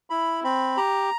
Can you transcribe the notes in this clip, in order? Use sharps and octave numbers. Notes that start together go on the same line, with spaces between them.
E4 B5
C4 B5
G4 A#5